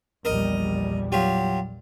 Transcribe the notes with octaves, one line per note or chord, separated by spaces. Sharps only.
A#1 E2 G3 A#4 D#5
F#3 F4 G4